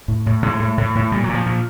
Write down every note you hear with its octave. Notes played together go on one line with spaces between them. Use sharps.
A2
A2
A2 G#3
A2
A2
A2
A#2 G3
F#3
A#2
F3
A#2